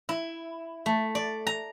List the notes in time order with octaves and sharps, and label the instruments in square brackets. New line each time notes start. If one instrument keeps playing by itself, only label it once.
[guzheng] E4
A3
D5
A#5